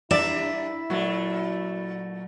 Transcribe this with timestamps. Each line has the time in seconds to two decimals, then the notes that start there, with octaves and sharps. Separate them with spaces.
0.11 G2 D4 E4 D5 E5
0.90 A#2 F#3 A3